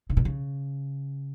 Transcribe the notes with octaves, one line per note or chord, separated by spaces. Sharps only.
C#3
B2
C#3